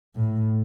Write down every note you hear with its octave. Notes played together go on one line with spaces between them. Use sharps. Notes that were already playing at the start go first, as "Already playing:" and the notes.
A2